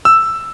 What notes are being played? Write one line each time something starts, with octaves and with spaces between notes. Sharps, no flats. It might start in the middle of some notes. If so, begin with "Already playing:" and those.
E6